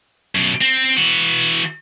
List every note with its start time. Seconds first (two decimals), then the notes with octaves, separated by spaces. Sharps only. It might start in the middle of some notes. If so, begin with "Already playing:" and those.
0.35 F#2 B2
0.61 C4
0.96 E3 F#4